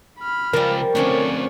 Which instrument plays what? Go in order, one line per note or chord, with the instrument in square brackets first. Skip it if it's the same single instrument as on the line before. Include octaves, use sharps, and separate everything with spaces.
[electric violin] B5 F6
[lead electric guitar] C#3 F4 [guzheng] F3 G3 [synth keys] A#4
[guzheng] D3 F3 C#4 [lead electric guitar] A3 C4 [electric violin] C#5 D5